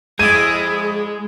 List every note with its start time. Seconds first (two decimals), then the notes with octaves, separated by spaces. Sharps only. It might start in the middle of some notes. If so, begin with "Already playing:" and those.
0.19 F2 G#3 E4 G#4 D5 G#6 D#7